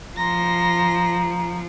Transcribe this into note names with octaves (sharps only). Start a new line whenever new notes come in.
F3 A#5 C6 A#6